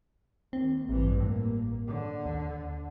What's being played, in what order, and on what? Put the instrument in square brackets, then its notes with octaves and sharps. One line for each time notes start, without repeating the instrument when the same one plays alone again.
[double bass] D#2 [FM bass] C4
[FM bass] A1 [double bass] G2 E3
[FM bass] A2 [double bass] A#3
[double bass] D3
[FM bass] D#2